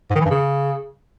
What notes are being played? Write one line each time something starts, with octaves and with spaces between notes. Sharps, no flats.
G#2
D#3
E3
G2
C#3